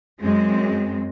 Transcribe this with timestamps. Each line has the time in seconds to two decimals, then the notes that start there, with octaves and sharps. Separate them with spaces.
0.22 F#2 G#3 C4